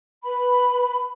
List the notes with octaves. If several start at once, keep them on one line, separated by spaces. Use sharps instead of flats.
B4 B5